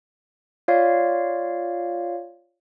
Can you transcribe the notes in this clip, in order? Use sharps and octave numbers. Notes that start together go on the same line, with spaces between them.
F4 C#5 D5 F5